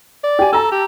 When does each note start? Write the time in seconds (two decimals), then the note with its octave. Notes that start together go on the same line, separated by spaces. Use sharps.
0.24 D5
0.39 G4 G#5
0.53 A4 A5 A#5 E6
0.72 G4